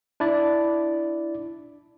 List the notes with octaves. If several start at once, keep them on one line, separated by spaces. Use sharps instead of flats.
D4 E4 D5